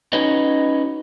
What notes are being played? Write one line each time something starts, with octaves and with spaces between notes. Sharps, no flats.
C#4 D#4 F#4 B4 C#5 D#5